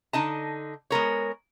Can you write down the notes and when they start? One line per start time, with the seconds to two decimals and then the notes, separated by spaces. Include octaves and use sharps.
0.13 D3 D#4 D#5 A5
0.90 G#3 B3 A#4 C#5